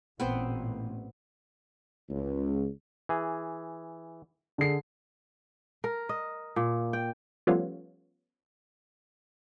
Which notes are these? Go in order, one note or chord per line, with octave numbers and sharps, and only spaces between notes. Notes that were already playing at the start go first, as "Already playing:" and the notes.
A1 A#2 B3 C4 C5
C#2
E3 G#4
D3 G#4 C7
A#4
D#5
A#2
G5
F3 G3 A3 B3 C#4 F4